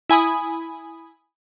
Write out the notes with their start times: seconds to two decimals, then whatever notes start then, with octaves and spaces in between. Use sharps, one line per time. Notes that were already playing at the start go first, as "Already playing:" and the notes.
0.10 E4 G#5 B5 D#6